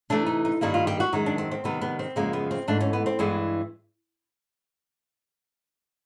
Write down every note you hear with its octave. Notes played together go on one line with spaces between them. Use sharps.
C3 E3 A3 D4
D#4
D#4
G2 D#3 G3 A#3 E4
F4
G4
F#4
F#2 D#3 G#3 D#4
D4
C4
C4
C3 D#3 G3 B3
B3
C4
F#2 C#3 F3 G#3 A#3
B3
C4
G#2 E3 A3 D4
C#4
B3
C4
G2 E3 G#3 B3